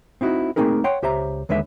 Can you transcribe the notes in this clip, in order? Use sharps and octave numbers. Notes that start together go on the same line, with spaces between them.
C4 D#4 E4 F#4
A3 A#3 C4 D#4 G#4 A#4
C#5 F#5 G5 C6
C#2 G4 C5 E5 A#5
D#2 D3 G#3 B4 E5